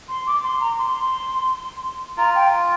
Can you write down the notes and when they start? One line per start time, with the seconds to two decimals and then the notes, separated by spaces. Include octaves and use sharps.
0.09 C6
0.27 D6
0.44 C6
0.60 A#5
0.78 C6
2.17 F4 A#5
2.35 G5